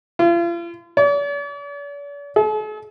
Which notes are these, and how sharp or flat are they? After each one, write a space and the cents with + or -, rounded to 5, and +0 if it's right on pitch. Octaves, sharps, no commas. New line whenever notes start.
F4 -40
D5 -45
A4 -45